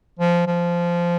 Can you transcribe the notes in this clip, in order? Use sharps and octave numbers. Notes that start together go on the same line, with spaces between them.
F3
F3